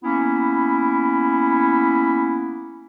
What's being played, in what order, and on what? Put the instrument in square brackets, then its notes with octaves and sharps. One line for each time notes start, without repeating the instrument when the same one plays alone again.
[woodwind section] A#3 B3 C#4 E4